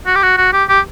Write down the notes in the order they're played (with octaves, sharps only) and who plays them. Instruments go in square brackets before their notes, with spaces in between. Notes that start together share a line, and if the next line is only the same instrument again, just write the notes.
[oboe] F#4
G4
F#4
F#4
G4
G4